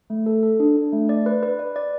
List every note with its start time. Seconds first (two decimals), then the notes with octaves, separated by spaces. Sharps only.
0.10 A3
0.26 A4
0.43 A4
0.60 D4
0.76 D4
0.93 A3
1.09 D5
1.26 B4
1.43 B4
1.59 D5
1.76 D5